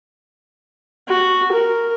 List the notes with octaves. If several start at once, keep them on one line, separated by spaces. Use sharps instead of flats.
F#4
A#4